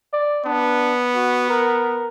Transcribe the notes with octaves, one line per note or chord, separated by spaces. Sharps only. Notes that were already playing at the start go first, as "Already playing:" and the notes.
D5
B3 D4
F#4
A#4